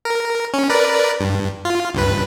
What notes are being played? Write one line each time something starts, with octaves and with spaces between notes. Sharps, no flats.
A#4
C#4
A#4 B4 D5
G2
F4
C#2 G2 B4